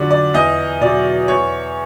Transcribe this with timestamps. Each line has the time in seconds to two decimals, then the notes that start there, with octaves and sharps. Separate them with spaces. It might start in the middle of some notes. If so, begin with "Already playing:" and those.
Already playing: F2 D3 F#3 D5
0.11 D5
0.34 E2 D#5
0.81 B2 F#3 D5
1.28 E2 C#5